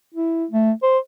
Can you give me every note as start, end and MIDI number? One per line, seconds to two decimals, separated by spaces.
0.14 0.45 64
0.51 0.72 57
0.83 0.99 72